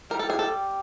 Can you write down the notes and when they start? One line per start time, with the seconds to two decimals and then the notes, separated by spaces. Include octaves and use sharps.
0.10 G3 A#4
0.19 A4
0.30 G#4
0.39 A4